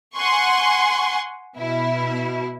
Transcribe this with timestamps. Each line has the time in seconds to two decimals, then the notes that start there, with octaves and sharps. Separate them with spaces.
0.15 F#5 G#5 C6 C#6
1.56 B2 E4